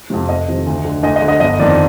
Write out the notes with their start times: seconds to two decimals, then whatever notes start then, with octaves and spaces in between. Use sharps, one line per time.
0.10 F2 C3
0.29 F1 D#5
0.48 F2 C3 D#3
0.67 D2
0.85 D3
1.03 D2 D#5
1.16 D#5
1.22 D3
1.28 D#5
1.40 G1 D#5
1.59 F2 D#3 D5